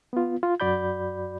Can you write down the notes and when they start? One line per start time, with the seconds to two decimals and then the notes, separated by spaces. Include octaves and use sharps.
0.13 B3 F4
0.43 F4
0.60 F#2 F#4 D5 B5 G6